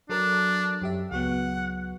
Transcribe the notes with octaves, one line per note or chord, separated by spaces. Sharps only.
F#3 D4 A4 A#4
F#2 G4 E5
C#2 F#3 B3 F#5